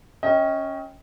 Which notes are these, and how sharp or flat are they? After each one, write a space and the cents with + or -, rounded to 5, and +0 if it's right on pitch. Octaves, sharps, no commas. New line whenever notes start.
C#4 +0 D#5 +35 G5 +0